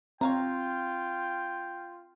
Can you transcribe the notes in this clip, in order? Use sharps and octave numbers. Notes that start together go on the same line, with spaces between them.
C4 F4 C#5 F5 G5 A#5